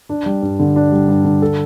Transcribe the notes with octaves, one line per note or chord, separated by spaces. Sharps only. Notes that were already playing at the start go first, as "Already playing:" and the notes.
D4
G3
G2
D3
D4
G3
G2
D3
A4